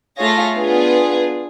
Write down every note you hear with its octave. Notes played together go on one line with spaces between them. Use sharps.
A3 F4 G#4 C#5 F5 A#6
B3 D4 F4 G#4